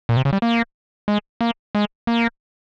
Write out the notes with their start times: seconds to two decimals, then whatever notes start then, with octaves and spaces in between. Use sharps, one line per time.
0.09 A#2
0.17 C3
0.25 C#3
0.33 G3
0.42 A#3
1.08 G#3
1.41 A#3
1.75 G#3
2.07 A#3